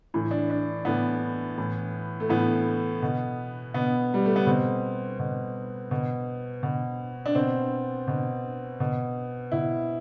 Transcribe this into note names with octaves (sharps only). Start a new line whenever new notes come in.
A2 E3
D4
D4
A2 E3 B3
A2 E3
A3
A2 E3 B3
B2
B2 B3
G3
A3
B3
B2 C4
B2
B2
B2
D4
B2 C4
B2
B2
B2 E4